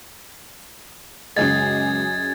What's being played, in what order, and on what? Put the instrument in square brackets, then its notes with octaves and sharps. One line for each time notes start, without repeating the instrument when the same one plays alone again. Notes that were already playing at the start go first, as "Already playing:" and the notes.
[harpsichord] C#2 [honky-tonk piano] F#2 G#4 D#5 [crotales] G#6 A6